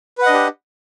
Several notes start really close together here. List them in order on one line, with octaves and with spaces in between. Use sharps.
B4 F#5 D#5 D4 G4